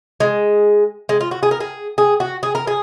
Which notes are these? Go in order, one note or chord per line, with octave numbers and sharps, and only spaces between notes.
G#3
G#3
F4
F#4
G#4
A#4
G#4
G#4
F#4
G#4
A#4
G#4